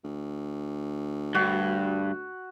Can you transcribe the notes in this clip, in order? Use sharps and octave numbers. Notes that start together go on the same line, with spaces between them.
D2
G2 F#4